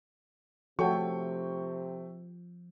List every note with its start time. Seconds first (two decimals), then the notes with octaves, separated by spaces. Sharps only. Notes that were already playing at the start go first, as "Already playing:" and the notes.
0.79 C3 F3 A3 F#4 A4 C#5 G5 C#6